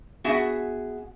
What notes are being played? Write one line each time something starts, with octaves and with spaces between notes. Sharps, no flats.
B3 F#4 G#4 E5 F#5